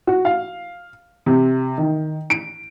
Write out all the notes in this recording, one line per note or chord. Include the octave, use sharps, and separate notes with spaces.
F#4
F5
C3
D#3
D7